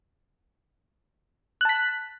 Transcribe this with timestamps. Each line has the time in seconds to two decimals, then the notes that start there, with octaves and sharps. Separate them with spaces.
1.61 F#6
1.65 A5
1.69 B6